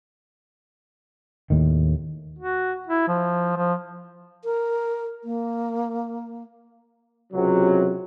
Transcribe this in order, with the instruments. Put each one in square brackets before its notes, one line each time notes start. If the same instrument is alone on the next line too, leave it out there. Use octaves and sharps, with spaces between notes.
[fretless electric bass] D#2 A2 D#3
[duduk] F#4
E4
F3
F3
[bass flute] A#4
A#3
[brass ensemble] C#2 C3 F#3